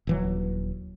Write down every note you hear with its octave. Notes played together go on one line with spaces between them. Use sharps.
D#1 E3 F#3